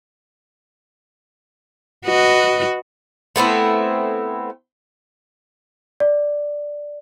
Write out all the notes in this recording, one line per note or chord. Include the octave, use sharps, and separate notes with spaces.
F#4 B4 D#5
A3 B3 C4 E4
D5